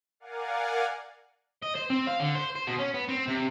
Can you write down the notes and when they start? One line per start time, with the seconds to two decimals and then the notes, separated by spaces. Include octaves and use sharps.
0.20 A#4 D5 F5 F#5 G#5
1.62 D#5
1.75 C5
1.90 C4
2.07 F5
2.20 D3
2.35 C5
2.56 C5
2.67 B2
2.79 C#4
2.94 B3
3.09 C4
3.28 C3